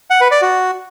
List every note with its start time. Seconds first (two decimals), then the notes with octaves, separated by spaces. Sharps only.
0.10 F#5
0.21 B4
0.31 D5
0.42 F#4